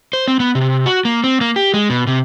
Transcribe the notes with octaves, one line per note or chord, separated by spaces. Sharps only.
C5
C4
B3
C3
F#4
A#3
C4
A#3
G4
G#3
B2
C3